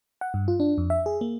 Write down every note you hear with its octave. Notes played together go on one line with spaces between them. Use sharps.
F#5
G2
F4
D4
F2
E5
G#4
A#3